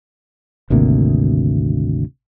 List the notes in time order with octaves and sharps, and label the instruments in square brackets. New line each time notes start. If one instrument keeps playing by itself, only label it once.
[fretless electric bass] G#1 D2 C3 A#3